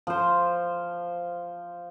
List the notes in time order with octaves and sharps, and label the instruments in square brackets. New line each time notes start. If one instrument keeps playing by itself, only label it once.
[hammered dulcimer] F3 C5